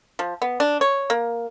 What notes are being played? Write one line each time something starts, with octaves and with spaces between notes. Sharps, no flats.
F3
B3
D4
C#5
A#3